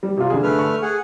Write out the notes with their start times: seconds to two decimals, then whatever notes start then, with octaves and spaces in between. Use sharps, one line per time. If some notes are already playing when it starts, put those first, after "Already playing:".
0.03 G3
0.17 C3 F4
0.30 D3 G#4
0.43 A3 B4 F6
0.59 C#6
0.82 G#4 F#5